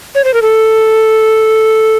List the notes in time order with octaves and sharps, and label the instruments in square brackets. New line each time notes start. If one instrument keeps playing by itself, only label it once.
[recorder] C#5
C5
A#4
A4